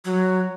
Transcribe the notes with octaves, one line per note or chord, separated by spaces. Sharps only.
F#3